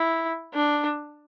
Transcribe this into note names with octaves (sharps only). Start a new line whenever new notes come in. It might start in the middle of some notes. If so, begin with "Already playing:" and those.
Already playing: E4
D4